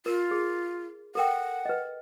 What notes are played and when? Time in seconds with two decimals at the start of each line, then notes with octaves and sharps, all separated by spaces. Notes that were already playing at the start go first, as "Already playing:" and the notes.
0.06 F4 A#4
0.31 G#4
1.15 A4 A#4 F#5 G5
1.65 B4 D#5